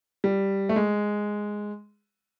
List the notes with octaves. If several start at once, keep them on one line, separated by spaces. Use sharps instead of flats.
G3
A3
G#3